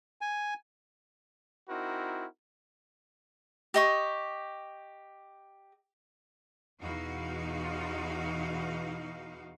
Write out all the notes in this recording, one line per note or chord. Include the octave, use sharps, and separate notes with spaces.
G#5
C4 D#4 E4 F#4 A#4
G4 D#5 C#6
E2 B2 E3 D#4 F#4 F5